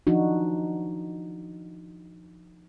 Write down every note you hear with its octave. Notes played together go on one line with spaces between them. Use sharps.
F3 D4 D#4 F#4